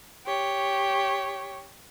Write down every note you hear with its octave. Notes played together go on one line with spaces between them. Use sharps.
G4 C#5